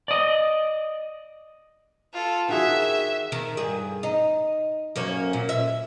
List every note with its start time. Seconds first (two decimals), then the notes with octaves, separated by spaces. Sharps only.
0.08 D5 D#5
2.13 F4 A4
2.49 D#3 F#4 G#4 E5
3.32 D#3
3.57 G2 G#4
4.03 D#4
4.96 F#2 A#3 C#4
5.33 A#2
5.49 E5